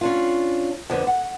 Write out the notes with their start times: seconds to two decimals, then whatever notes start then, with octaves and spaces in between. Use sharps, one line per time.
0.01 C#4 D4 F4
0.90 F2 D3 B3
1.07 F#5